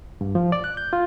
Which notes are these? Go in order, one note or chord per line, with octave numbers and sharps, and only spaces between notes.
G2
F3
D5
F#6
G6
F4